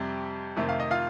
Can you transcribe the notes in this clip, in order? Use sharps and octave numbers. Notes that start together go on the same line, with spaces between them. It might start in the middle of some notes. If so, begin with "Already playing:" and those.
Already playing: F2 C3 G3 G4
F2 C3 D#3 A3
F5
D#5
F4 F5